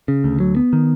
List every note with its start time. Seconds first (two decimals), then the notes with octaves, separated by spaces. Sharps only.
0.08 C#3
0.24 D2
0.40 F#3
0.56 B3
0.73 D#3